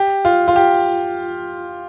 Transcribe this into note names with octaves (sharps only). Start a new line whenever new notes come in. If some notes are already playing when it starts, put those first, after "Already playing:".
Already playing: G4
F4
F4
G4